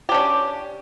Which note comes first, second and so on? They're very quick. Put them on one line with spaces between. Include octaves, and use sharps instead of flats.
G4 D4 C#4